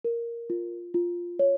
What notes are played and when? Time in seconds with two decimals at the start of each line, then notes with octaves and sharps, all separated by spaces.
0.05 A#4
0.50 F4
0.94 F4
1.39 C#5